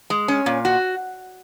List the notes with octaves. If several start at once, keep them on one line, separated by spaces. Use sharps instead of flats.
G#3
C#4
A#2
F#4